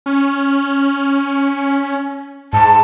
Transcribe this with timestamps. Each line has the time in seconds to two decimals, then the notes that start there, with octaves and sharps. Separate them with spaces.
0.06 C#4
2.53 G#2 A5